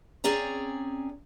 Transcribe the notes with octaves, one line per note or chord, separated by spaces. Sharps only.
C4 C#4 G#4 D5 A#5